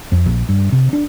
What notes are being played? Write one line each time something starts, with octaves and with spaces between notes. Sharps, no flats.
F2
A#1
G2
C3
D4